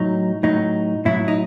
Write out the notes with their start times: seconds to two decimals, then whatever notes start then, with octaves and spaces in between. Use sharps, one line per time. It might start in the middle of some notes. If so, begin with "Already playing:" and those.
Already playing: A2 F#3 D#4
0.43 A2 F#3 D#4
1.05 A2 F#3 E4
1.28 D#4